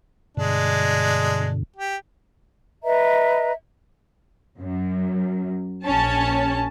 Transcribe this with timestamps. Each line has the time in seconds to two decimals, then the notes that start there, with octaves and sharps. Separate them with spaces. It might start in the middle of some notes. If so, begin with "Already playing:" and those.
0.37 G2 B2 D3 G#3 D4
1.76 G4
2.84 B4 D#5 E5 A#5
4.59 F#2
5.85 A#1 C#4 A5